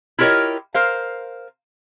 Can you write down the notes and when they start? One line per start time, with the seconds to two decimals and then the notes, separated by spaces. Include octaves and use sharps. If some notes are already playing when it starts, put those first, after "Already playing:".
0.19 E4 F4 G4 A#4 C#5 D#5
0.74 A#4 C5 F5